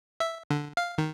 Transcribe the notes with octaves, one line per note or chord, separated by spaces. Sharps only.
E5
D3
F5
D#3